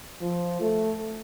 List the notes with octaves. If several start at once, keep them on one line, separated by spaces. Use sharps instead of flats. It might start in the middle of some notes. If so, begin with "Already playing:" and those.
F3
A3